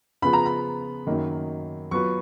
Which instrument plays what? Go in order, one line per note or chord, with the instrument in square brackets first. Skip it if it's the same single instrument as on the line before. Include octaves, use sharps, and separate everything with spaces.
[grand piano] C#3 F3 B3 F4 G#4 [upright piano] B5
[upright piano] A#5
B5
[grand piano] F#2 D#3 F#3 A#3 D#4
[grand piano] F#3 B3 F4 B4 [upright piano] C#6